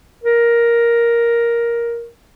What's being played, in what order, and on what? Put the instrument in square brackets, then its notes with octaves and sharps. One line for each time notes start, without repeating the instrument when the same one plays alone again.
[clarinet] A#4